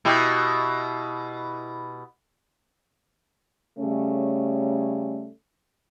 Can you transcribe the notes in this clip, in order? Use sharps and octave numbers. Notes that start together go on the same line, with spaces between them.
B2 E4 G4
C#3 G3 A3 C#4